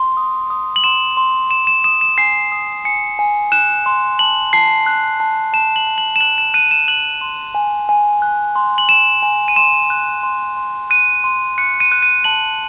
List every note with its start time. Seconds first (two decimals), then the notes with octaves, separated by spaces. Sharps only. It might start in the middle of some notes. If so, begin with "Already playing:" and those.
Already playing: C6
0.17 D#6
0.50 D#6
0.76 F#7
0.84 C6 E7
1.17 C6
1.51 C6 E7
1.67 E7
1.84 D#6 E7
2.01 E7
2.18 G#5 C7
2.52 D#6
2.85 G#5 C#7
3.19 G#5
3.52 F#6 E7
3.86 C6
4.19 A5 F#7
4.53 A5 C7
4.86 F#6
5.20 A5
5.53 A5 E7
5.76 F#7
5.87 A5
5.98 F#7
6.16 E7
6.21 F#6 F#7
6.38 E7
6.54 F#6 D#7
6.71 E7
6.88 F#6 F#7
7.21 C6
7.55 G#5
7.89 G#5
8.22 F#6
8.56 C6
8.78 F#7
8.89 G#5 E7
9.23 G#5
9.48 D#7
9.56 C6 E7
9.90 F#6
10.23 C6
10.57 C6
10.90 F#6 D#7
11.24 C6
11.58 F#6 C#7
11.80 D#7
11.92 F#6
12.03 D#7
12.24 A5 F#7